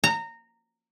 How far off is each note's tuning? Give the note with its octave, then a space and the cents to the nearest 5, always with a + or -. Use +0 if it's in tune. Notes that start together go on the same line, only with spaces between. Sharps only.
A#5 -20